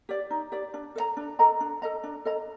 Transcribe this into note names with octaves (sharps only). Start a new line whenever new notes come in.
G4 D5
D#4
G4 D5
D4
A4 D#5 A#5
D4
A4 D#5 A#5
D4
A4 D#5 A#5
D4
A4 D#5 A#5